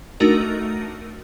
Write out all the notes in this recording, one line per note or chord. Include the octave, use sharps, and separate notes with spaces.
A3 D4 D#4 F#4 A#4